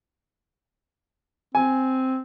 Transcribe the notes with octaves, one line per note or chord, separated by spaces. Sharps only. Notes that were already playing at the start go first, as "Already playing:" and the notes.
C4 G#5